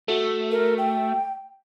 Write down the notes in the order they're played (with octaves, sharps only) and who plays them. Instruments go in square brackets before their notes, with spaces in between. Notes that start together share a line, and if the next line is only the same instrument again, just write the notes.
[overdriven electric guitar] A3 [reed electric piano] F#4 A4
[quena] A#4
G5